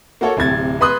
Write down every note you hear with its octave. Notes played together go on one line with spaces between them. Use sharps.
A#3 F#4 A4 C#5
D1 C3 G#6 A6
B4 B5 C6 D#6 F#6